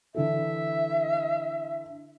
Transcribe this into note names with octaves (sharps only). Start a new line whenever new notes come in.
D3 E3 A4 E5